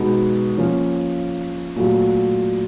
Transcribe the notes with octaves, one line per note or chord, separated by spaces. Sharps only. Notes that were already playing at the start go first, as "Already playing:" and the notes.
Already playing: B2 G#3 B3 D#4
F3 A#3 C#4
A#2 F#3 A3